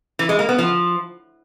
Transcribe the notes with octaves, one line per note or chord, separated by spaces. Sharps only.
E3
G#3
A#3
B3
F3